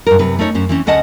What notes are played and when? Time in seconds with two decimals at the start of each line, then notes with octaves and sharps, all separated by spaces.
0.07 G2 A#4
0.19 F#2 C3 B4
0.39 A3 C#4 D#4 C#5
0.55 F#2 C#4 C5
0.69 E3 C4 C#4
0.87 D2 C#4 D#5 F#5 A5